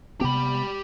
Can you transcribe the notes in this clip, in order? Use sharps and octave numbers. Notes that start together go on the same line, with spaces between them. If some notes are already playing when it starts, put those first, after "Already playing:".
C3 B3 G4 B5